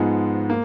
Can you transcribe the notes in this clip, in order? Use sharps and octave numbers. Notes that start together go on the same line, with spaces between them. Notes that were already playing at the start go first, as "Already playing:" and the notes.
Already playing: G#2 F3 G#3 B3
A#3